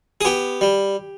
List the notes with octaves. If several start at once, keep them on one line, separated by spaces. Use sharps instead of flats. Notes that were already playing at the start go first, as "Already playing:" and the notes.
G#4
B3 G4
G3